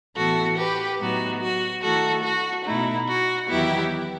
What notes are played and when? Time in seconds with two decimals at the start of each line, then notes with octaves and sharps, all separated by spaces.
0.15 A2 E3 B3 E4 F#4 A4
0.57 G4 B4
0.99 A2 F#3 B3 D#4 F#4
1.41 F#4
1.82 D#3 A3 E4 F#4 A4
2.24 F#4
2.66 B2 A3 D#4 E4
3.09 F#4
3.49 E2 D#3 F#3 B3 E4 G4